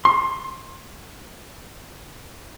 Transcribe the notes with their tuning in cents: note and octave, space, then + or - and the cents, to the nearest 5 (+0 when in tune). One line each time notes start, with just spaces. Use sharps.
C6 +20